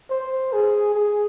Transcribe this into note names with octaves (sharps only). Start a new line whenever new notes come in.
C5
G#4
G#4